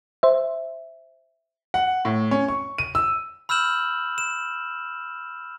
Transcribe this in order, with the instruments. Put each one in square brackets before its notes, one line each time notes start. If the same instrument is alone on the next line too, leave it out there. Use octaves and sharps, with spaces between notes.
[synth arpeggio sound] C5 E5
[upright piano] F#5
A2
C#4
C#6
D#7
E6
[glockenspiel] B5 E6 F6 G6 E7 F#7
E7